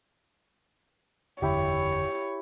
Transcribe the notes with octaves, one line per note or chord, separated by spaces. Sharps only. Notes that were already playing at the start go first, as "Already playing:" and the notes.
F#1 E2 D3 E4 G4 C#5